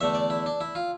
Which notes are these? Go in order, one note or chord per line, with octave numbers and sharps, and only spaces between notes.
E2 D3 A3 E5
D5
E4
D4
E4
F4